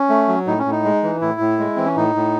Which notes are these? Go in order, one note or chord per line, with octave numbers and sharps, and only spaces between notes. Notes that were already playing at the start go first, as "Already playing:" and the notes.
Already playing: C#4
A3
F#3
A2 D#4
C#4
A2
D#4
G#3
E3
A2 E4
A2
G#3
E3 C4
C#4
A2 D#4
A2